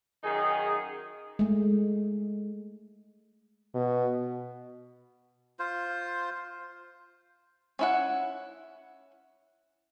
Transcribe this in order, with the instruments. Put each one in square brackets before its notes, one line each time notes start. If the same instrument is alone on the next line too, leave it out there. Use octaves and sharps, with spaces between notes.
[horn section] F#2 D#3 D#4 G#4
[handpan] G#3 A3
[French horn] B2
[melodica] F4 C5
[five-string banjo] C#4 E4 F#5